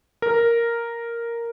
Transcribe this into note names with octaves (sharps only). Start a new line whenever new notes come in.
A#4